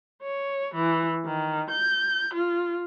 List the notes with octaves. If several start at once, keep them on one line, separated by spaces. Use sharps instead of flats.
C#5
E3
D#3
G6
F4